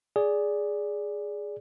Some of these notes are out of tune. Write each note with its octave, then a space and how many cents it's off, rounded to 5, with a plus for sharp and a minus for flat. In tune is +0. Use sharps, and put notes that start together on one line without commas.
G#4 +0 D5 -10